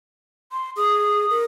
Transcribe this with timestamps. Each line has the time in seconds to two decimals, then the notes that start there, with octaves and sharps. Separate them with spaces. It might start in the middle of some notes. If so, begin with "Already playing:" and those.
0.52 C6
0.77 G#4 D#6
1.30 A#4